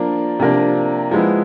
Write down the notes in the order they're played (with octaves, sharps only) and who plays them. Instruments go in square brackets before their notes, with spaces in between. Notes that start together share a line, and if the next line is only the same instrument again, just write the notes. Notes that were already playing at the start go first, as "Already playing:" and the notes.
Already playing: [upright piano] F3 A#3 D4 F4
C3 F3 A#3 D4
F3 G#3 B3 E4